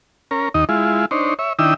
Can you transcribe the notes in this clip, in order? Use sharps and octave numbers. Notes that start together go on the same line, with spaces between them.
C#4 A#4
D#2 D#4 D#5
G#3 E4 F4
D4 D#4 C5 C#5
C#5 E5
D#3 D4 E4 G5 D#6 E6